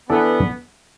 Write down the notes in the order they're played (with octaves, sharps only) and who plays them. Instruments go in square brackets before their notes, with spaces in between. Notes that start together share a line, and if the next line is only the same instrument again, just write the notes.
[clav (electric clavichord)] E3 D4 A4 D5 [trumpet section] B3